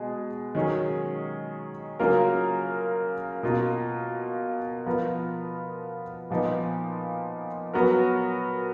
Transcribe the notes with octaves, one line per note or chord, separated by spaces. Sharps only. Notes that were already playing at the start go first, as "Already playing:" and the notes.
Already playing: B2 G#3 G#4
D#3 F#3 C#4 G#4
C#3 F#3 A#3 F4 A#4
B2 A#3 F4
F3 B3 F4 A#4
A#2 F3 B3 D#4
F#3 B3 F#4 A#4